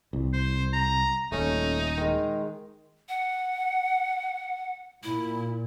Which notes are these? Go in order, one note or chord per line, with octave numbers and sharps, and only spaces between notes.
C2
C5
A#5
D#1 A3 C#4 D#4
D#3 G#3
F#5
A#2 E4